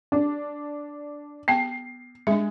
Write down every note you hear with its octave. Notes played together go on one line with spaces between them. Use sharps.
D4
B3 G5 A5 C7
G#3 D4 E5